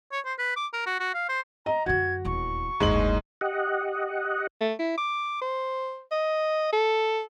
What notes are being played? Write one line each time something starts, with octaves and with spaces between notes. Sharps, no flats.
C#5
C5
B4
D6
A#4
F#4
F#4
F5
C5
D#5 A#5
F#2 D3 F#4 G#6
D#1 E2 C#6
F#1 D2 G#2 G#3 F#7
G4 D#5 F#5
A3
E4
D6
C5
D#5
A4